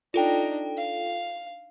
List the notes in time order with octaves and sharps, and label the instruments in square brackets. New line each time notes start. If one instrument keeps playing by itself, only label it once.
[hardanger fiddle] D4 D#4 [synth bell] F4 A4 G5
[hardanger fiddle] F5